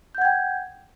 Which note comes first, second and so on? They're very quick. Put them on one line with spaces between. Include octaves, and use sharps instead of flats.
G6 F#5 G#6 G5